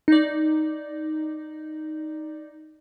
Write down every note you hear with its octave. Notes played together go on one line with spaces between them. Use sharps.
D#4 D5